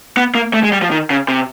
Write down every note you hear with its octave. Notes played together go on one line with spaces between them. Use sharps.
B3
A#3
A3
G#3
G3
F3
D#3
C#3
C3